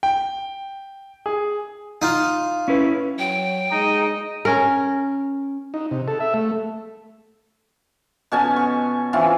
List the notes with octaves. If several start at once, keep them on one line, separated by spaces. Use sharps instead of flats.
G5
G#4
D#4 F4
C#4 E4 B4
F#3 G5
G#3 D#4 D#5
C#4 A#4
D#4
C3
A4
E5
A3
B2 C#4 G#5 A5
C#6
E3 C4 C#4 F4